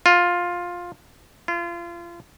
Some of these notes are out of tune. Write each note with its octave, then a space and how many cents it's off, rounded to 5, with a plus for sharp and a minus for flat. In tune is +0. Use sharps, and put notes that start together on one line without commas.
F4 +10
F4 -30